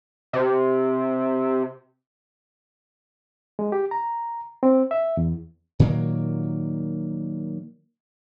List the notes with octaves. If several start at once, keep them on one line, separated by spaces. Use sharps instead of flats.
C3
G#3
G4
A#5
C4
E5
E2
A#2 D#3 F#3 A#3